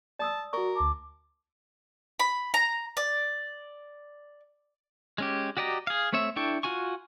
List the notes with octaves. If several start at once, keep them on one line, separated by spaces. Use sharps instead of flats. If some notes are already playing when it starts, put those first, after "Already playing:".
D5 A5 D#6 E6
F#4 A#4 D5 C#6
D2 A5 D6
B5
A#5
D5
G#3 C#4 G4
F#4 G4 D5 D#5 A#5
G#4 F5
A3 C4 C#5 E5
D4 E4 A4 G5 C#6
F4 F#4 G#5 C#6